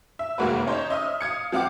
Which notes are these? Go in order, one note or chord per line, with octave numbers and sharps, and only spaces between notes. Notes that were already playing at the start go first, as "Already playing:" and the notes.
E5
F1 D#2 G#3 A#3 F#4 B4
C#4 D#4 C5 C#5
D#5 E5 D#6 F6
F5 D#6 G#6 C#7
F3 C4 F5 F#5 D6